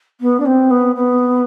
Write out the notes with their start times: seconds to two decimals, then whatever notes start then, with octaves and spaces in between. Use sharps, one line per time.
0.20 B3
0.40 D4
0.45 C4
0.70 B3
0.95 B3